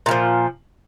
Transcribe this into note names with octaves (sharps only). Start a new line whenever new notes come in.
A#2 D#3 F3